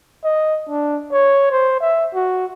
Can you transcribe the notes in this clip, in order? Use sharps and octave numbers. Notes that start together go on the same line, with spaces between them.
D#5
D4
C#5
C5
E5
F#4